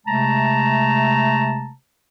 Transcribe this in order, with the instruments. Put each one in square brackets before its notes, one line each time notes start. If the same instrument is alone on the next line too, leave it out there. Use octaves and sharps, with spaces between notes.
[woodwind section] C3 G#3 A3 A5 A#5